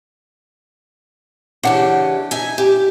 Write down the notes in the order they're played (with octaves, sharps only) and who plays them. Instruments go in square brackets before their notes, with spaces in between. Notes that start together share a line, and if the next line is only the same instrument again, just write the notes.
[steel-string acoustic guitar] C#3 E3 G4 [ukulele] D4 F#5 A5
[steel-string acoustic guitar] D#4 E5 G#5
G4